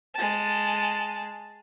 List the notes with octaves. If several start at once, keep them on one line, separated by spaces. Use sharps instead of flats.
G#3 A5